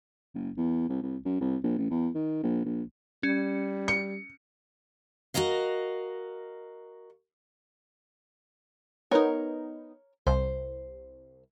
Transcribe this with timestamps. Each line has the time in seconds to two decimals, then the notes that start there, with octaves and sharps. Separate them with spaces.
0.35 F#1
0.57 E2
0.89 C2
1.02 C2
1.25 F#2
1.41 C2
1.63 A#1
1.78 A1
1.90 E2
2.15 D#3
2.43 A#1
2.65 A#1
3.23 G3 C#4
3.88 C#7
5.34 F#4 G#4 A#4 D#5 F5
9.11 B3 D#4 A#4 C#5
10.27 C2 C5